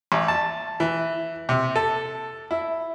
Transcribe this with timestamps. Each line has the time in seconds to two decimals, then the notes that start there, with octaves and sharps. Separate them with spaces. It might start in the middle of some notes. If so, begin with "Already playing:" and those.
0.12 A1
0.28 A5
0.80 E3
1.49 C3
1.76 A4
2.51 E4